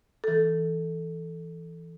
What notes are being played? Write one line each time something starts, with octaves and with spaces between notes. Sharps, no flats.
E3 A4